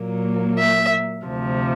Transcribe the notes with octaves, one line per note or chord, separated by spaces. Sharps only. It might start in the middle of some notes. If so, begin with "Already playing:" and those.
Already playing: A#2 F#3 A#3
E5
D2 C3 F3